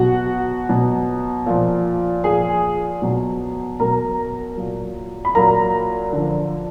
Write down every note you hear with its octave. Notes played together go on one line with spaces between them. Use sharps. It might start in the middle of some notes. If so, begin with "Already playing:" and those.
Already playing: B2 F#3 F#4 F#5
B2 F#3
A#2 F3
A#2 F3 G#4 G#5
B2 F#3
B2 F#3 A#4 A#5
A#2 F#3
B5
A#2 F#3 A#4 A#5
D3 F3